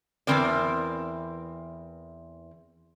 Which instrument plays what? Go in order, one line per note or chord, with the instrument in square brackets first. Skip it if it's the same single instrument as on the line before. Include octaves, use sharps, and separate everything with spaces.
[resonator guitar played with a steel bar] E2 D#3 E3 C4 A#4 D5